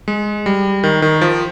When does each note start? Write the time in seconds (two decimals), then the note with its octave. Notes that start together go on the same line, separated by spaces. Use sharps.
0.08 G#3
0.46 G3
0.84 D#3
1.02 D#3
1.21 F3